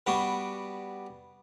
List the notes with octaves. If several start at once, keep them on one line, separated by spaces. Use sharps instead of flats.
G3 B3 D4 F#4